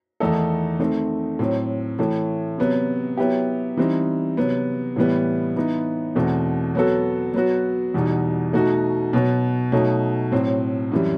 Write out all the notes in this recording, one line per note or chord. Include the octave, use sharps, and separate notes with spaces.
E2 D#3 A3 D#4 A4
D#3 A3 C4
A2 F#3 C4
A2 E3 A3
C3 F#3 B3
F#3 B3 E4 G4
E3 G3 C4 D#4
C3 F#3 B3
A2 E3 G3 B3
E3 B3 D#4
E2 B2 A3 C4
F#3 B3 F#4 A4
F#3 B3 F#4
E2 B2 G3 D#4
B2 A3 D#4 F#4
B2 F#3 B3
B2 F#3 A3 D#4
A2 F#3 C4
F#2 E3 G3